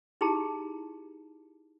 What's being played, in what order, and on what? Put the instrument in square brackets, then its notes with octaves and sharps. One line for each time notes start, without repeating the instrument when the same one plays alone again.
[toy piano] D#4 E4 G4 G#4 A5 A#5